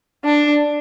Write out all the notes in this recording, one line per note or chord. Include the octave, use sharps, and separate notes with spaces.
D4